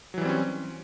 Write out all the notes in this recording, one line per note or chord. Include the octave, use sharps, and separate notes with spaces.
E3 F#3 G3 C4 C#4